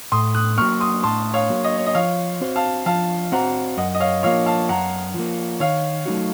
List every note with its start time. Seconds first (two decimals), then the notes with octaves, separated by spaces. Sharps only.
0.12 A2 C6 D#6
0.35 D#6 F#6
0.58 A#3 C#6 F6
0.61 F#3
0.80 C6 D#6
1.03 A2 A5 C6
1.34 C#5 F5
1.50 F#3 A#3
1.64 D#5
1.78 C#5
1.86 D#5
1.95 F3 C#5 F5
2.41 C4 F#4 C5
2.56 F5 A5
2.86 F3 F5 A5
3.32 C4 F#4 C5 F#5 A#5
3.77 F#2 D#5 F#5
3.95 D#5
4.00 C#5 F5
4.23 F3 A#3 C#5 F5
4.46 F5 A5
4.69 F#2 F#5 A#5
5.14 F3 A#3
5.60 D#3 C#5 F5
6.06 F#3 A3 D#4 F#4